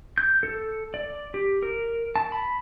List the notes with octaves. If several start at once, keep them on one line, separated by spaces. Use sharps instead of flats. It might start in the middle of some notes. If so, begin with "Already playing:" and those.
G6
A4
D5
G4
A#4
A5
B5